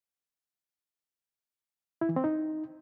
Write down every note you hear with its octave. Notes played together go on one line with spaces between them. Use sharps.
E4
E3
C4
D#4